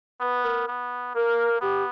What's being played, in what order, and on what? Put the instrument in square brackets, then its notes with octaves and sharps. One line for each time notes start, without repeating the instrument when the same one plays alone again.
[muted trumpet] B3 [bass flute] B4
[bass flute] A#4
[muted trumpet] B3
[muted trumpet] A#3 [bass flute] A#4
[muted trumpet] B3 [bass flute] G4